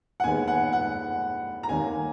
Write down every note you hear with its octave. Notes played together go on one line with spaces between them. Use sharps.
F#5
D#2 D#3 G#3 B3 G#5
F#5
F#5
A#5
D#2 D#3 A#3 G#5